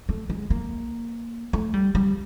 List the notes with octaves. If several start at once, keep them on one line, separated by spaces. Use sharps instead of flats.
A3
G#3
A#3
A3
G3
G3